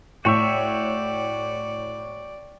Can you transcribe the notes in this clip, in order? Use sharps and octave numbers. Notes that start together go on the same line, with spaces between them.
A2 F#4 C#5 D5 E5 G5 C#6